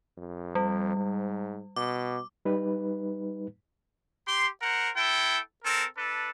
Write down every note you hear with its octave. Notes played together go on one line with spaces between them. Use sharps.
F2
G3
G#2
B2 D6
G3 D#4 B4
G4 C6
A#4 C5 F#5
E4 A4 G5
C4 A4 A#4
D4 A4 B4